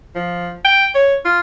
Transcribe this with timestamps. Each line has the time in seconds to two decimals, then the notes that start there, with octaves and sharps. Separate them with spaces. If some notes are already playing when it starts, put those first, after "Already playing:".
0.15 F3
0.65 G5
0.95 C#5
1.25 F4